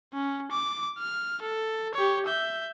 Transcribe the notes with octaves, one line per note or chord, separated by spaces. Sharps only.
C#4
D6
F6
A4
G4 C#5
E5 G6